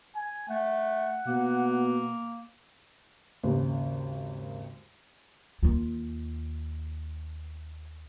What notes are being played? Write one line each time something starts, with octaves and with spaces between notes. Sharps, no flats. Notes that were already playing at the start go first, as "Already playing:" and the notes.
G#5
A3 F#5
B2 A#3
G#1 D#2 C#3
D#2 F4